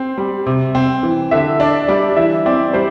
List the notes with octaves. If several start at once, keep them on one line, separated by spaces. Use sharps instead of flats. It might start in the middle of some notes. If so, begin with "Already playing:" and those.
Already playing: C4 C5
G3
C3
C4
E3
D3 E5
D4 D5
G3 D5
E3 E5
C4 D5
G3 C5